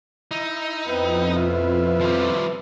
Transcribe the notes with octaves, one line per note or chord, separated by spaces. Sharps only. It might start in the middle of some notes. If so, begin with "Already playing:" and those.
D#4 E4
F2 B3 C4 E4 B4
B2 E4 F4 B4 E5
F3 G3